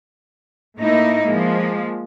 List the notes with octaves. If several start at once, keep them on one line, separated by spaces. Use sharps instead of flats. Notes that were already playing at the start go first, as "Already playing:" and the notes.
A2 A3 A#3 D#4 E4
F3 G#3 A#3